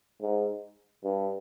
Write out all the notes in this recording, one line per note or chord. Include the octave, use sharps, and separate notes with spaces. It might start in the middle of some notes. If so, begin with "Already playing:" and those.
G#2
G2